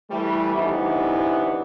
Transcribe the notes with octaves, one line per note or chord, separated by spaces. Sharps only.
E3 G3 A3
D2 C3 E3 B3 D#4 E4